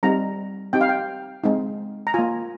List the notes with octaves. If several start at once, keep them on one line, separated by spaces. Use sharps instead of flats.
G3 C4 D#4 A#5
C4 D#4 G4 G5
F5
G5
G#3 C4 D#4
A#5
A#3 F4 G#5